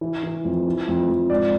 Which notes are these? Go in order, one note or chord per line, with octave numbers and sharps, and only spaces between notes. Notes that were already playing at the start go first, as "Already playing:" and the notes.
E3
E3
F2
E3
F2
F2
G#2 D5